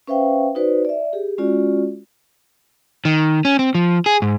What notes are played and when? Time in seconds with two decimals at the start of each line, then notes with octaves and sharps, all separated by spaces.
0.07 C#4 B4 C5 E5 F5 G5
0.55 D#4 F#4 B4 C5 D5
0.85 D5 E5
1.13 G4 G#4
1.38 G#3 C#4 F4 F#4 D5
3.05 D#3
3.45 C#4
3.59 C4
3.75 F3
4.06 G#4
4.22 G#2